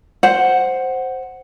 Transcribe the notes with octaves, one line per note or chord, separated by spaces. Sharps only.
C5 F#5